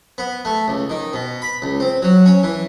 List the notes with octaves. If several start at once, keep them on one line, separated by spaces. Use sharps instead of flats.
B3
A3
C#2
D#3
B2
B5
C#2
C4
F#3
C#4
E3